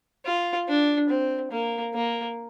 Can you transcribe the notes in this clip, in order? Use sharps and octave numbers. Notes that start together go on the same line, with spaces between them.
F4
D4
C4
A#3
A#3